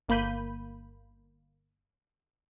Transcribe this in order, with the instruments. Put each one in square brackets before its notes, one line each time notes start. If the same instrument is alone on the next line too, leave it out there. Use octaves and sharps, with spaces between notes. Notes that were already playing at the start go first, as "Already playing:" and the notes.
[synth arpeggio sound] G1 A#3 B5 G6 D#7